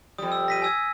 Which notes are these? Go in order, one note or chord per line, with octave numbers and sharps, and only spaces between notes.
F2 G3 D#6
E6
A#6 B6 D#7
G#5 E6 G#6